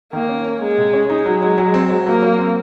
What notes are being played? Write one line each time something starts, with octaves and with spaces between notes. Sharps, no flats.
D#3 A#3
C#4
C#4
G#3 A#3
C3
C#4
G#3 D#4
F#3
F#3
F#3
C4
F#3
F#3 A#3
F#3
C4